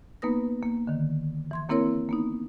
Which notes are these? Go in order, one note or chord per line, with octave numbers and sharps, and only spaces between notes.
A#3 B3 D#4 B4 D#6 A#6
A#3
D3 D#3
E3 C6 G#6
E3 A#3 C4 E4 A#4 C#5
A#3 B3 D#4